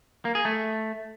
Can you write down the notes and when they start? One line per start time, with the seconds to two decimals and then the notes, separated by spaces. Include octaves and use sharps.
0.25 A#3
0.35 G#4
0.45 A3